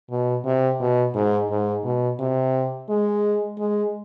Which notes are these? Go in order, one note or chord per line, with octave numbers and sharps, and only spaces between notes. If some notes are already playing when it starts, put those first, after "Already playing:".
B2
C3
B2
G#2
G#2
B2
C3
G#3
G#3